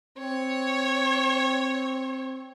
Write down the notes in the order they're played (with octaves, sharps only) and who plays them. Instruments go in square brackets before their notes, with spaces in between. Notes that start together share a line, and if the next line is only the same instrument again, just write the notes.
[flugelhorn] C4 [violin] C#5